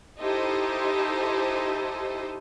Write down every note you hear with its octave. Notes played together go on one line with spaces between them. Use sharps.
D#4 E4 G4 A4 C5 D#5